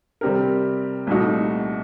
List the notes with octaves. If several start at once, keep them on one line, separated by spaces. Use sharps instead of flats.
C3 G3 C4 G4 A#4
C2 A#2 A3 D#4 F#4